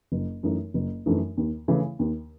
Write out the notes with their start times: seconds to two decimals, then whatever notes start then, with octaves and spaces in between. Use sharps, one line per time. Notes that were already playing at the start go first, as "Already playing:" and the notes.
0.12 F#1
0.43 F#2 E3 A3 D#4
0.74 F#1
1.06 F#2 E3 A3 D#4
1.37 D#2
1.68 C#3 E3 A3 E4
1.99 D#2